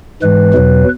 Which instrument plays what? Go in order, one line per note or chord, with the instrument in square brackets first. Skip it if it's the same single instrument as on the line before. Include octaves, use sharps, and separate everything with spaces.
[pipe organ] G#2 E3 G#3 B4
E2 B2 F#3